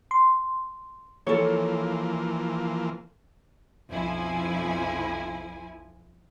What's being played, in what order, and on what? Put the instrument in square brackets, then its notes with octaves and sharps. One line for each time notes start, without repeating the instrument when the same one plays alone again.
[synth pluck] C6
[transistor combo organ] E3 F3 A#3 [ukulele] A4 C#5
[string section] B1 F2 F3 E4 G#5